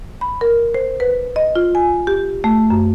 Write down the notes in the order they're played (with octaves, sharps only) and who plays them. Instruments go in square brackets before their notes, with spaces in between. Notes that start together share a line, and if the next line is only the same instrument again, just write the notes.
[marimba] B5
A#4
C5
B4
D#5
F4
G#5
G4
A3
F#2